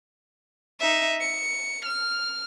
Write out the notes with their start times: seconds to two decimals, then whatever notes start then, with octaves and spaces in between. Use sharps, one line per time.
0.80 D#4 E5
1.21 C#7
1.86 F6